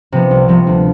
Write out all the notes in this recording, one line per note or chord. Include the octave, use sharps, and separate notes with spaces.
C3 F3 B3
C2
C3 F3 B3
D2